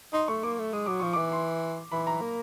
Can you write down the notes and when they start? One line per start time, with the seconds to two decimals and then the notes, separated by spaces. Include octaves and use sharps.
0.13 D#4 C6
0.28 A3 C#6
0.43 A#3 D6
0.59 A3
0.73 G#3 D#6
0.86 F#3 D6
1.00 F3 C#6
1.13 E3 D6
1.32 C6
1.92 E3 B5
2.07 A#5
2.21 A#3